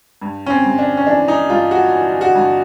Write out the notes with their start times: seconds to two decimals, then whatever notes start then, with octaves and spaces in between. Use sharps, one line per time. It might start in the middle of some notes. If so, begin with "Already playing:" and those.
0.22 G2
0.46 C#4
0.50 C4
0.65 G2
0.78 D4
0.97 C#4
1.07 E3 D4
1.28 D#4
1.50 G2 F4
1.71 F#4
1.92 E3
2.21 F#4
2.35 G2